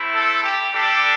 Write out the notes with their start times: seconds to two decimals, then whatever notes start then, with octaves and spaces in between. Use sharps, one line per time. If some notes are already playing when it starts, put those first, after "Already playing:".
Already playing: A3 C4 E4
0.14 A4
0.43 G4
0.72 G3 D4 G4 A4